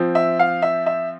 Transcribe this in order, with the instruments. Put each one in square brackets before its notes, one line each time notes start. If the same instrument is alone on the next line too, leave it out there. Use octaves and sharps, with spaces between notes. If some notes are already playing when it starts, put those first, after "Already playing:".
Already playing: [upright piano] F3 C4
E5
F5
E5
E5